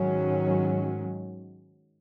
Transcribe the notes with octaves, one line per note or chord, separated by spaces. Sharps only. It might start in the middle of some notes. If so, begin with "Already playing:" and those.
Already playing: G#2 D#3 F#3 C#4